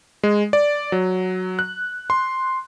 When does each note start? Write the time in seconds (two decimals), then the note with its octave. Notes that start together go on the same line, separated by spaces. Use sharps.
0.23 G#3
0.53 D5
0.92 F#3
1.59 F#6
2.10 C6